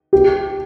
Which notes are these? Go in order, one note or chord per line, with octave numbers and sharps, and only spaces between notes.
G4